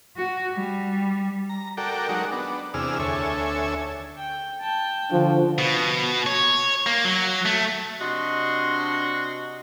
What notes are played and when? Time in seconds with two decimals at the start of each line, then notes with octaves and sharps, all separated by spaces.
0.17 F#4
0.54 G3
1.49 A#5
1.77 F#4 A4 A#4 D5 G5
2.09 F#3 G#3 D#4 F#4 A#4
2.32 B3 D4
2.74 E2 C3 D4 G#4 E6 F6
3.00 D2 A4 C#5 E5 G#5
4.17 G5
4.60 G5 A5
5.12 D3 F3 F#4
5.58 B2
6.26 C#5
6.86 A#3
7.05 F#3
7.45 A3
8.01 C3 D4 F#4 D#5 C6